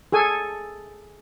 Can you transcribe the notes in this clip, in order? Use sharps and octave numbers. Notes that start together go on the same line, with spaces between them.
G#4 A4 G#5